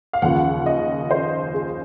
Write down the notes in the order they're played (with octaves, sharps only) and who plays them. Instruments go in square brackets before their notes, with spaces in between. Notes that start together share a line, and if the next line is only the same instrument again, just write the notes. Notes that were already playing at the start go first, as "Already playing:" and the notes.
[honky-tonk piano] F5
D#2 C#3 F3 F#5
D#5
C5
G#4